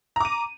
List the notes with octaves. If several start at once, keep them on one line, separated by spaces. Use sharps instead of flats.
A#5 D6 D#7